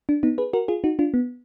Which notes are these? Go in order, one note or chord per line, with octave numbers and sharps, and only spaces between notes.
D4
B3 D#4
G#4 B4
F#4 A#4
F4 G#4
D#4 F#4
D4 F4
B3